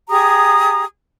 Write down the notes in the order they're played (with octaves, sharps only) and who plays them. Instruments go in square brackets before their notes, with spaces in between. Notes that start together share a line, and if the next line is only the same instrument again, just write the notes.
[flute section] G4 G#4 A#5 D#6